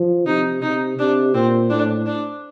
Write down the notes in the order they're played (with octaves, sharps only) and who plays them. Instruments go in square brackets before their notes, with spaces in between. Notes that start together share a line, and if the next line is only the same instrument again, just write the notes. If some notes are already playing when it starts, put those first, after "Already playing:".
Already playing: [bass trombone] F3
[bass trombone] C3 [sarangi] D#4
[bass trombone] C3 [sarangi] D#4
[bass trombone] C3 [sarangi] D4
[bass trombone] A#2 [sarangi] C4
[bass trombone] A2 [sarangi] D4
[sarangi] D4